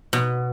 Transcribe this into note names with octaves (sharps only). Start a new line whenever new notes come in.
B2